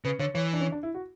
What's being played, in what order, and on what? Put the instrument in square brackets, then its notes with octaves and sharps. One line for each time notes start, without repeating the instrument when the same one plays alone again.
[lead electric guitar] C#3 [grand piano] B4
[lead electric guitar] D3 [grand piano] C#5
[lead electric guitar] E3 [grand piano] C#5
[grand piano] D4
C#4
D4
E4
F#4